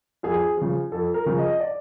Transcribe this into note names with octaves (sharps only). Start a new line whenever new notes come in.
F2 G#4
C#3 F3
F2 A4
A#4
C#3 F3
D#5
D5